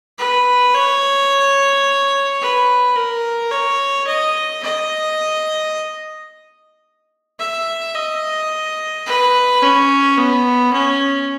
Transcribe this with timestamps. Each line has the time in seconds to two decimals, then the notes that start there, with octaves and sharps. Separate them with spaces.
0.19 B4
0.75 C#5
2.41 B4
2.96 A#4
3.51 C#5
4.07 D#5
4.63 D#5
7.39 E5
7.95 D#5
9.06 B4
9.62 C#4
10.17 B3
10.73 C#4